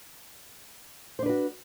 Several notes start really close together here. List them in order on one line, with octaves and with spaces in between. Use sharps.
C5 D4 B4 F#4